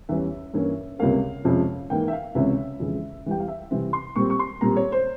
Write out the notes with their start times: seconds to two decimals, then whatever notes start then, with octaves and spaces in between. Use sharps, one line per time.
0.09 E2 E3 G3 C#4 E5
0.53 G2 E3 A#3 C#4
0.99 C#2 C3 G3 A#3 C#4 F5
1.44 F2 C3 F3 G#3 C#4
1.90 G#2 E3 A#3 G5
2.08 E5
2.13 F5
2.35 C#2 C3 E3 G#3 C#4 E5
2.80 F2 C#3 E3 G#3
3.26 E2 E3 G3 G5
3.40 F5
3.48 E5
3.71 C3 E3 G3 C4
3.93 C6
4.16 A#2 G3 C4 C#6
4.30 C#6
4.39 C6
4.61 A#2 G3 C4 A#5
4.77 C#5
4.92 C5